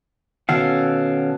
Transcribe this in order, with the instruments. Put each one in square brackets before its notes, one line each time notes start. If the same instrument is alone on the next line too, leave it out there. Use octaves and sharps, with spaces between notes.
[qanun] B2 [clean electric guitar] D#3 F#5 [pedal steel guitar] C#4 A4 F5